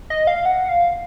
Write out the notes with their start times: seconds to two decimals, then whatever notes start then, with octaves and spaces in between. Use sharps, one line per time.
0.10 D#5
0.27 F5
0.45 F#5
0.69 F5